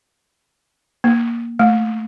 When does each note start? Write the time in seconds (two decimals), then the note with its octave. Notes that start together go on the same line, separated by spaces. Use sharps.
1.04 A#3
1.59 A3